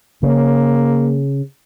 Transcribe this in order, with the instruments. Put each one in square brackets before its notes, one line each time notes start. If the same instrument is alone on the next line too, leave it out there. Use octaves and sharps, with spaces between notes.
[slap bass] C#3 [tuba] A#3